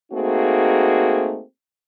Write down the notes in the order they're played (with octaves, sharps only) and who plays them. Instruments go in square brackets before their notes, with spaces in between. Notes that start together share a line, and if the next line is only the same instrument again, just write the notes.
[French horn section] A3 A#3 C4 D#4 F#4 G#4